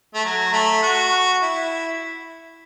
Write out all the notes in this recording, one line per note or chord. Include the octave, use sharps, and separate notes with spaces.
A3
F#3
A3
F#4
E4